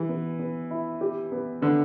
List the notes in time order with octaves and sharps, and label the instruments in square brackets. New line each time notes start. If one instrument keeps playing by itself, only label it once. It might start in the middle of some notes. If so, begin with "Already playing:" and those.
Already playing: [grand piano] E3 [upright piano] G4
[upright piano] B3
B3
E4
G4
B3
[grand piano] D3 [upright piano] B3